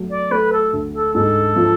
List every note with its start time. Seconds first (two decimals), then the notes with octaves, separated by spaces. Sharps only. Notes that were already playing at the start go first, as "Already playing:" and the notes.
Already playing: F#3 A3
0.10 D5
0.31 A3 B4
0.52 A4
0.73 D2
0.94 A4
1.15 G#2 A4
1.56 F3